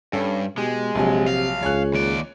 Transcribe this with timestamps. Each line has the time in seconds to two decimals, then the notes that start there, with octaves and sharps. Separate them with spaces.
0.13 G2 C#4 A4
0.58 B2 G#3 G4
0.95 A#1 C3 F#3 G#5
1.28 F5
1.63 C#2 C#5 G#5 F#6
1.94 D#2 D5